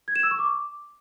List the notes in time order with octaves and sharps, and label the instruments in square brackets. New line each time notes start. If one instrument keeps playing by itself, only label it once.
[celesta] G#6
E7
E6
C#6
D6